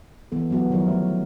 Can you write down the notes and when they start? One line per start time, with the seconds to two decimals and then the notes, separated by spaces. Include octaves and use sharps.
0.32 E3 B3 A4
0.50 F#3 G3 B3 F#4 B4
0.70 D#3 F3 F#3 B3 E4 A#4
0.86 F3 A3 C#5